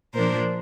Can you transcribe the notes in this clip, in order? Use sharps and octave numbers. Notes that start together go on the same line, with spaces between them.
A#2 F3 A#3 D4 A#4 C5